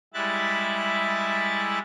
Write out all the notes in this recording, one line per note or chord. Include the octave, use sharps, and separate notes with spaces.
G3 G#3 E4 E5 F#6 A6